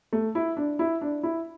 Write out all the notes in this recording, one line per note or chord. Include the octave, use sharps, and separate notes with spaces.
A3
E4
D4
E4
D4
E4